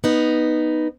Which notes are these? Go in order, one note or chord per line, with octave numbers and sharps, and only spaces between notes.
B3 D#4